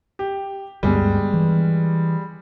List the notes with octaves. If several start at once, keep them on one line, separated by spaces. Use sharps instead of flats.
G4
D2 G2 G3 G#3 B3
E3